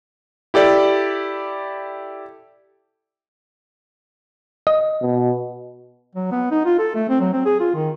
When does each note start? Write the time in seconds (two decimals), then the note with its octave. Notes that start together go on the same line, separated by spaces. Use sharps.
0.54 E4 G4 A4 D5
4.67 D#5
5.02 B2
6.15 F#3
6.31 B3
6.51 D#4
6.65 F4
6.79 A4
6.95 A3
7.09 C4
7.21 F#3
7.33 C4
7.46 G#4
7.60 F4
7.75 D#3